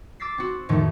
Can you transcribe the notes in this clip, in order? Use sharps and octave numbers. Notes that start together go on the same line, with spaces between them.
D6 E6 A6 B6 C7
C4 F#4
F2 A2 D#3 F3 A3 D#4